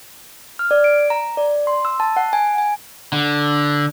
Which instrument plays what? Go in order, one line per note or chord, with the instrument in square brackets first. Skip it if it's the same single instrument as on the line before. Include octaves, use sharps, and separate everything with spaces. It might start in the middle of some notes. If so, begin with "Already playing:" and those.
[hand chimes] F6
D5
D7
A#5
D5
C6
E6
A5
F#5
G#5
G#5
[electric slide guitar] D3